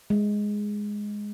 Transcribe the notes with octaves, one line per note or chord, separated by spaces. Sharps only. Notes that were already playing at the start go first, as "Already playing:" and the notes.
G#3